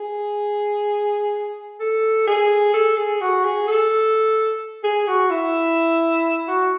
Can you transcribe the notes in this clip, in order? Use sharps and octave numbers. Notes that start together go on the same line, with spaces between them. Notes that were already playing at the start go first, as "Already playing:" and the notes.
Already playing: G#4
A4
G#4
A4
G#4
F#4
G#4
A4
G#4
F#4
E4
F#4